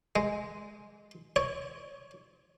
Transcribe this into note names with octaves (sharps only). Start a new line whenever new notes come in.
G#3
C#5